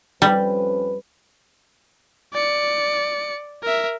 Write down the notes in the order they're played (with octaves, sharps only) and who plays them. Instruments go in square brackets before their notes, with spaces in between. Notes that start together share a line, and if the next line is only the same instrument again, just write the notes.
[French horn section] F2 C#4 B4 [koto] G3
[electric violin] D5 C#7
A#4 E5